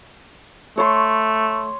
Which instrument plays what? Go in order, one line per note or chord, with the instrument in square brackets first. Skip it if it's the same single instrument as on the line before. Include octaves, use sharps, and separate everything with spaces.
[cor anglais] A3 [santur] C#5 C6